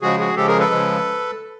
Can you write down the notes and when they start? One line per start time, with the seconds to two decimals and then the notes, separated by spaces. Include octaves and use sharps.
0.02 C#3 F3 G#3 F#4 G#4
0.20 F#4 G#4
0.36 C#3 F3 G#3 G4 A4
0.48 G#4 A#4
0.59 A4 B4
0.71 C#3 F3 G#3